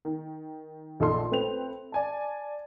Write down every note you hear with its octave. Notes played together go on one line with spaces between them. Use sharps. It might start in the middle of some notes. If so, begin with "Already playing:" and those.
D#3
A#1 D#4 A4 D5 C6
A3 C4 B4 C5 F7
D5 G#5 A5